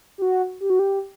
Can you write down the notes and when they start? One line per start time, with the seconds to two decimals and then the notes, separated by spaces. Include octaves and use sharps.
0.18 G4
0.22 F#4
0.61 G4
0.70 F#4
0.79 G4